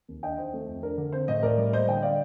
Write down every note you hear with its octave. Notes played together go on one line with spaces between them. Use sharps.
D#2
D4 D#5 G5
D#3 C5
A3
F2
D4 A#4
D3
C4 C5
A2 C5 D#5
A2 A#4 D5
G3
A#3 C5 D#5
D3 D#5 G5
D4 D5 F5